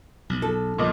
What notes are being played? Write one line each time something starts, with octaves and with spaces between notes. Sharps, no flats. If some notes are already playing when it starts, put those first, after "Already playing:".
B1
A4
A#1 G2 A#2 D#5 D6